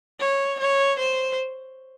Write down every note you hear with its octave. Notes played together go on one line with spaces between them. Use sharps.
C#5
C#5
C5